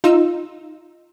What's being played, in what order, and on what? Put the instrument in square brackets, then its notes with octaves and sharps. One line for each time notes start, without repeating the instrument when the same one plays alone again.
[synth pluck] D#4 F4 E6